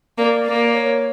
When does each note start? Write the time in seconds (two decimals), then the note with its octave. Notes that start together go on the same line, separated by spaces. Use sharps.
0.18 A#3 D5
0.46 A#3
0.74 C#5